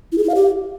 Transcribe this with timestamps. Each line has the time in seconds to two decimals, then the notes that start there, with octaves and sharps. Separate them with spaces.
0.12 E4
0.18 G#4
0.24 E4
0.29 F5
0.35 G4